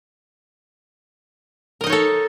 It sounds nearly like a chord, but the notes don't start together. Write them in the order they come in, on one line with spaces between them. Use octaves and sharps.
A#4 D#5 D#4 C#5 A4